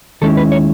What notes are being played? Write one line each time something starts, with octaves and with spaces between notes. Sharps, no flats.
D#2 D#3 G#3 C#4 E4 A4
B4
C#5